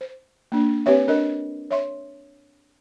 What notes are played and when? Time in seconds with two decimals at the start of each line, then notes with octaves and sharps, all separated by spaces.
0.01 C5
0.52 A#3 D4
0.86 C4 G4 B4 C#5 E5
1.08 D4 A#4 D#5
1.70 C#5 E5 C6